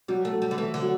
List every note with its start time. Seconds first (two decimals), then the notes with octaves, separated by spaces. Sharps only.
0.08 F#3 G3
0.25 A3
0.33 F#3
0.42 G3
0.51 D3
0.58 E3 A3
0.74 D3
0.82 F#3